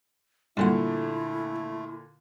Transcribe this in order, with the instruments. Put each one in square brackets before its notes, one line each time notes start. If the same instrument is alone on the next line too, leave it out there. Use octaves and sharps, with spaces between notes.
[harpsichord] G2 F#3 F#5 [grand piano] A#2 D3 [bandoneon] A3 [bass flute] E4